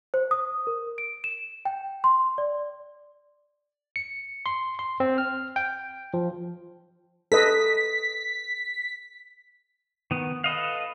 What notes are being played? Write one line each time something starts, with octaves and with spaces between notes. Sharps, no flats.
C5
D#6
A#4
D7
E7
G5
C6
D5
C#7
C6
C6
C4
F6
G5
F3
A4 B4 D#5 B6
D#3 B3
A4 B4 D#5 F5